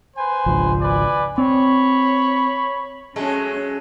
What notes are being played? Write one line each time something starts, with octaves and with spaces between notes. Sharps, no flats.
B4 C5 G#5
G#1 C#2 F3
B4 D5 G#5
C4 C#5 B5
F#3 G#3 A3 C#4